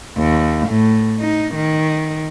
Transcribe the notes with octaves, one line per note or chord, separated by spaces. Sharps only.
D#2
A2
D#4
D#3